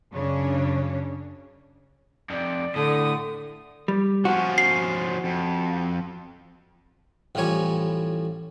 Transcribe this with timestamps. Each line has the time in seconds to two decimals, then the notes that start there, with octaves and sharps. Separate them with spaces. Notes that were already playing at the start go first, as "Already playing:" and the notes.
0.13 F#2 C#3 C#4 D4 C#5
2.30 F2 C3 D5
2.75 A2 D3 D#6
3.88 G3
4.25 F3 C#4 F#4
4.58 C7
5.25 F2
7.35 A1 A2 F3 G3 C#5 G#5